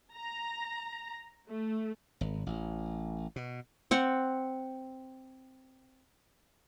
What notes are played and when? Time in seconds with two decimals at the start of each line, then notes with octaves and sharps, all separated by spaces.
0.15 A#5
1.48 A3
2.21 G#1
2.46 A1
3.36 B2
3.91 C4 F#5